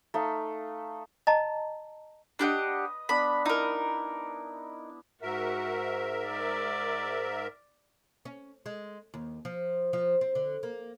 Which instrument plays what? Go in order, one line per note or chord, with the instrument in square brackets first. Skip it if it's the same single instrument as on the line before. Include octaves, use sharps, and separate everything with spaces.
[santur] A3 D#4 F5
[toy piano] D#5 A5 A#5
[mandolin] D4 G4 F#5 [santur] B4 D#5
[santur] B3 D4 [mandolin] B5
[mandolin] D#4 A#4 [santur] E4
[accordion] G#2 A#4 E5 [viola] F#4
[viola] D5
[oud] C#4
G#3
D#2
F3
F3
C4
D3
A#3